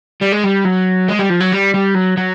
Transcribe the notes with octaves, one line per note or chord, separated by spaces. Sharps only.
G3
G#3
G3
F#3
G#3
G3
F3
F#3
G3
G3
F#3
F#3